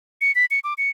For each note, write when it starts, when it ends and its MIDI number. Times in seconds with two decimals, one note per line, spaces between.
0.21 0.34 97
0.35 0.45 95
0.51 0.59 97
0.64 0.74 86
0.78 0.90 97